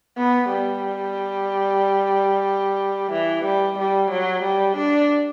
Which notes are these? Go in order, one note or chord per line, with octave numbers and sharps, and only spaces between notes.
B3
G3
E3
G3
G3
F#3
G3
D4